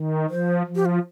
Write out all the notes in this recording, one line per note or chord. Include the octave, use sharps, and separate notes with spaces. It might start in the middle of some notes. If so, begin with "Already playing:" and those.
Already playing: D#3
F3 C5
F3
G4
F4